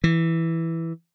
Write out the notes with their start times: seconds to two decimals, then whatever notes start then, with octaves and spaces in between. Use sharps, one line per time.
0.04 E3